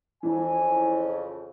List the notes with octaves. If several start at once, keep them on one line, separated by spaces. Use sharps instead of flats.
F2 C#3 E3 G#5